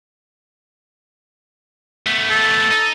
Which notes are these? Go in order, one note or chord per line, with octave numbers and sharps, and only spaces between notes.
A3 B3
A4
D#4